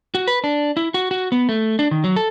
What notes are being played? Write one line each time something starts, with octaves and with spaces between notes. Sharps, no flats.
F#4
B4
D4
E4
F#4
F#4
B3
A3
D4
D#3
F#3
A4